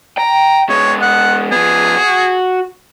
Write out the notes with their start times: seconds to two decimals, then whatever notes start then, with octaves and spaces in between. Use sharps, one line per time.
0.18 G5 A#5
0.69 G#3 B3 C#5
1.02 F#5
1.52 F3 B3 G#4
1.97 F#4